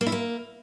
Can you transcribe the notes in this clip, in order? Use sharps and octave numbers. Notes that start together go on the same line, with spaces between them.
A#3
E4
A#3